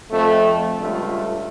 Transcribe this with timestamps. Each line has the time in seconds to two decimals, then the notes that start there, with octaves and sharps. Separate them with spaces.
0.11 F2 A3
0.79 C#2 G2 A3 F4